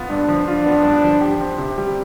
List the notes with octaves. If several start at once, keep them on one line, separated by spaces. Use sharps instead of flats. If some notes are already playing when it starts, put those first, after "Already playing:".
Already playing: B3 F4
G2 D4
F3
D4 F4
B3
G2
F3
G4
C4
C3
G3